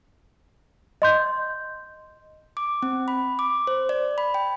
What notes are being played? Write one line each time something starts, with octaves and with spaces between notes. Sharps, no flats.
D#5 C6 G6
D6
C4
B5
D6
C5
D5
B5
G5